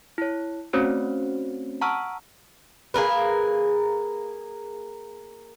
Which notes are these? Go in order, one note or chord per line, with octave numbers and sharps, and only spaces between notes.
E4 C#5
A3 C4 C#4 F#4 C5 C#5
F#5 A5 A#5 C#6 E6 F6
A#3 G#4 A#4 B4